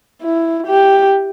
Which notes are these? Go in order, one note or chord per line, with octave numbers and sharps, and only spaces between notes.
E4
G4